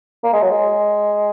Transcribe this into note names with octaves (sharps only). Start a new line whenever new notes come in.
A#3
G#3
F#3
G#3